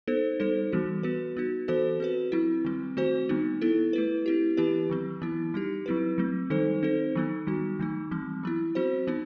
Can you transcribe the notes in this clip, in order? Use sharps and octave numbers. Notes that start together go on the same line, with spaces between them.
B3 D#4 A4 C5
G3 D#4 A4 C5
E3 G3 B3 F#4
B3 F#4 B4
B3 D#4 F#4
E3 B3 F#4 A4 C5
C4 F#4 B4
F#3 C4 E4
D#3 G3 C4
D#3 A3 C4 F#4 C5
D#3 G3 B3 D#4
B3 E4 A4
A3 E4 B4
C4 E4 G4
E3 B3 E4 G4 B4
D#3 F#3 C4
E3 B3 E4
G3 D#4 G4
F#3 C4 E4 B4
F#3 A3 C4
D#3 G3 D#4 A4 C5
C4 D#4 A4 C5
D#3 F#3 B3 D#4
D#3 G3 D#4 F#4
D#3 F#3 A3 D#4
E3 G3 C4
F#3 B3 E4
F#3 C4 F#4 C5
E3 B3 D#4